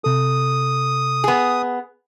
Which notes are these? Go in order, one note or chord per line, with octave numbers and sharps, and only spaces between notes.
C3 A4 D#6
B3 G#4